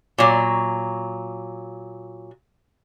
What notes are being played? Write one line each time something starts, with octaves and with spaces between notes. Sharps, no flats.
A#2 F#3